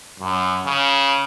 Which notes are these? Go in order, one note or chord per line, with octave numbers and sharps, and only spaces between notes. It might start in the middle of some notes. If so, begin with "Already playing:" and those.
F#2
C#3